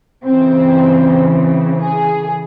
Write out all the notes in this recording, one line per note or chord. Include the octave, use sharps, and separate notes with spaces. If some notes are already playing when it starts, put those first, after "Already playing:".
C#3 E3 C4
C4
G#4